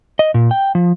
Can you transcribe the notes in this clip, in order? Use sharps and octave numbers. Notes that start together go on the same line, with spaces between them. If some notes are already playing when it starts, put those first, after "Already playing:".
D#5
A#2
G5
F3